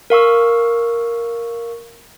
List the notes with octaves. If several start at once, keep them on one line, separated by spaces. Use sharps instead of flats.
A#4 F5 C#6 E6